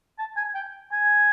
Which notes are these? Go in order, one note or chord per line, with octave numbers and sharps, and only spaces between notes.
A5
G#5
G5
G#5